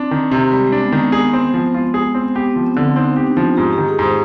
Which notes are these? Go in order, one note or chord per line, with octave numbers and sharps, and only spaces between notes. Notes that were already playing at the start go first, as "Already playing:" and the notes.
Already playing: C4 D4
D#3
C3
G3 G#3
G#3
D4
B3
D#3
B3
B3 G#4
C4
F3
G#3 F4
G#4
C4
B3 G4
B3
F3
C4
D3
C4 D#4
G4
D4
F3
F4
G#2 G4
D#3 G4
G#4
G#2 C5